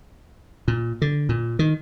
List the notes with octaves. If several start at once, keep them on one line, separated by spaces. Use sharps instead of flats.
A#2
D3
A#2
D#3